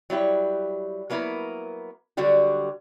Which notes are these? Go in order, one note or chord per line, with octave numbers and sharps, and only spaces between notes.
F#3 G3 E4 G4
F#3 A#3 B3 E4 A#4
D3 F#3 G3 F#4 G4